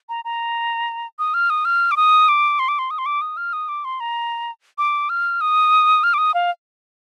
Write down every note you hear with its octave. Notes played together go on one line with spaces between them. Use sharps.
A#5
A#5
D#6
F6
D#6
F6
D6
D#6
D6
C6
D6
C6
D#6
C6
D6
D#6
F6
D#6
D6
C6
A#5
D6
F6
D#6
F6
D6
D#6
F5